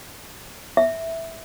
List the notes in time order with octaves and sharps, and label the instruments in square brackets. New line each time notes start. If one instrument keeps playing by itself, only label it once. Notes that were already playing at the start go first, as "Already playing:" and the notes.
[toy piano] E5